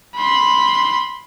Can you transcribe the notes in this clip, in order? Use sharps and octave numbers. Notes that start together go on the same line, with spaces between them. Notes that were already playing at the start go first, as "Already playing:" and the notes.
B5 C6